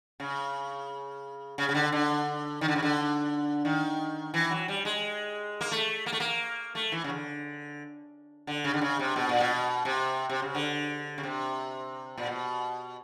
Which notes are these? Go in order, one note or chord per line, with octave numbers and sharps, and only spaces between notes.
C#3
C#3
C#3
D3
D3
D#3
D3
C#3
D3
D#3
E3
F#3
G3
G#3
A#3
A3
A#3
A3
A#3
A3
E3
C#3
D3
D3
C#3
D3
C#3
C3
B2
A#2
B2
C3
C3
C#3
D3
C#3
C3
A#2
B2